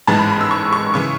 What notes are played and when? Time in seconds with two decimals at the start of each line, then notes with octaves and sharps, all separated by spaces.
0.07 A1 G#2 E3 G#3 A5
0.19 B5
0.30 B5
0.41 E6
0.51 C#6
0.73 C#6
0.94 C#3 E3 C#6